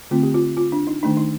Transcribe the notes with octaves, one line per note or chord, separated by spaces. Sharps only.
D3 A3 C4 F4
G4
F4
F4
D4
D#4
D#3 A3 D4 D#4
D#4